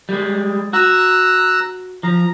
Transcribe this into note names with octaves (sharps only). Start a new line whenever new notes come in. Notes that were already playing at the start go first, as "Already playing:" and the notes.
G3 G#3
F#4 A#5 E6 F#6
F3 A#5